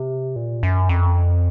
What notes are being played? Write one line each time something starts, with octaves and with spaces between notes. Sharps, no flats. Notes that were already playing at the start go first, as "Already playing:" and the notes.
Already playing: C3
A#2
F#2
F2